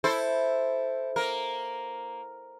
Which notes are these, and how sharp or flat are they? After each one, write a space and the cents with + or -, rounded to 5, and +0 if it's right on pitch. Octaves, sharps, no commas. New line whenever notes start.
E4 +0 A4 +0 C5 +0
A#3 +0 A#4 +0